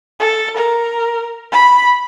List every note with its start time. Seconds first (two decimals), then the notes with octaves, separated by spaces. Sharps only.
0.20 A4
0.56 A#4
1.52 B5